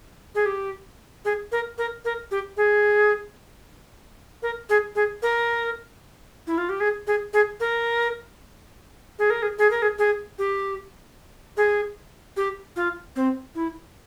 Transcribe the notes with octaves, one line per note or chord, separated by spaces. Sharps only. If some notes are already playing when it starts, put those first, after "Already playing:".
G#4
G4
G#4
A#4
A#4
A#4
G4
G#4
A#4
G#4
G#4
A#4
E4
F4
G4
G#4
G#4
G#4
A#4
G#4
A#4
G#4
G#4
A#4
G#4
G#4
G4
G#4
G4
F4
C4
E4